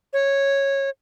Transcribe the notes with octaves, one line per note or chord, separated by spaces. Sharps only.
C#5